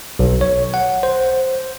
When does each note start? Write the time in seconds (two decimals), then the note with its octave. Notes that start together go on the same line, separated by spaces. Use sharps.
0.19 B1
0.41 C#5
0.74 F#5
1.03 C5